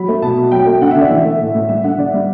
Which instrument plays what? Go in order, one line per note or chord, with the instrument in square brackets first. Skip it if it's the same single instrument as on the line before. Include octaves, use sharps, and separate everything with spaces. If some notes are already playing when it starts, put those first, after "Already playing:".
Already playing: [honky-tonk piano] F#3 B5
A3
B2 A5
B2
F#3 G5
A3
D3 F#5
E5
D3 D5
E3 E5
A3
A2
A2
G3 E5
D3 F#5
D3 D5
G3